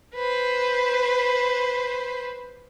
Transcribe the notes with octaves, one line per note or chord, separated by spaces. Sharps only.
B4 C5